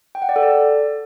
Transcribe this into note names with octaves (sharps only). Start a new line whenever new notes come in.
G5
F#5
D5
A4
D5